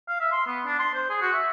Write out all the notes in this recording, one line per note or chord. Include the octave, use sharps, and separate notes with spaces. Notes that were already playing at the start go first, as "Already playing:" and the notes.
F5
E5
C6
B3
D4
C6
C5
G#4
F#4
E5